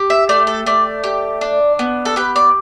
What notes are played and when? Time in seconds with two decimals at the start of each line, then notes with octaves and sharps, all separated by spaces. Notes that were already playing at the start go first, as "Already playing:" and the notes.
Already playing: G4
0.10 E5
0.29 A3 D5
0.47 A4
0.66 A3 D5
1.04 G4
1.41 D4
1.79 B3
2.05 A4
2.16 G4 B4
2.36 D5